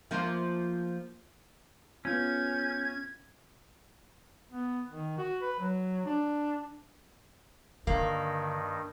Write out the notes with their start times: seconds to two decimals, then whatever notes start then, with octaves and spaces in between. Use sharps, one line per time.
0.11 F3 A#3 F4
2.05 B3 C#4 F4 G#4 F6 G6 G#6
4.52 B3
4.88 D#3
5.18 F#4
5.42 B4
5.60 F#3
6.06 D4
7.87 G2 D3 D#3 A#3